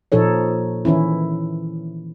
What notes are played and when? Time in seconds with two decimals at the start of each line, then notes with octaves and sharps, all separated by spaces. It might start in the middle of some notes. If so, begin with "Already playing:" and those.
0.12 A#2 F3 D#4 A4 C#5
0.85 D#3 E3 C#4 E4